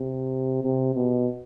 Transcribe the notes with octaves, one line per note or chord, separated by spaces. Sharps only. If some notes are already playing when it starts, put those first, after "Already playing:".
Already playing: C3
C3
B2